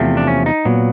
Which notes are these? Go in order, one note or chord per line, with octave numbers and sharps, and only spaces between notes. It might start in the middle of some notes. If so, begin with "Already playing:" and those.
Already playing: E2 C3 F3 A3 C4
D4
C#4
D#4
A#2 F#3 B3